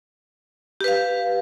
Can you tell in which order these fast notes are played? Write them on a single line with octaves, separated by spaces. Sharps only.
G4 B4 F5